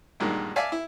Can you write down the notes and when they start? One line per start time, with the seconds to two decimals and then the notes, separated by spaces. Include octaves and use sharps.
0.20 B1 G2 A#2 D#3 G#3
0.56 D5 E5 F5 G#5 A5
0.72 E4